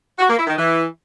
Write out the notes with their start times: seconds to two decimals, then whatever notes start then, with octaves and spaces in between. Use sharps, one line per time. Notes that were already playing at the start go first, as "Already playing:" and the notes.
0.19 F#4
0.28 A#3
0.38 E4
0.47 D#3
0.57 E3